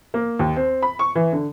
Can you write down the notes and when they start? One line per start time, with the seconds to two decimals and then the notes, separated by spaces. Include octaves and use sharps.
0.14 A#3
0.39 D#2
0.56 C4
0.82 B5
0.99 C#6
1.15 E3
1.33 D3